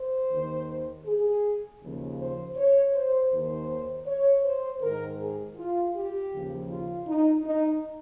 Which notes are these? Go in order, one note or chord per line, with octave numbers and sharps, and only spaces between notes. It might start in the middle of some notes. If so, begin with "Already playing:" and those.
Already playing: C5
D#2 D#3
G#4
D#2 C#3 F3
C5
C#5
C5
D#2 D#3 C5
C#5
C5
G#2 D#3 A#4
G#4
F4
G4
D#2 C#3 F3
F4
D#4
D#4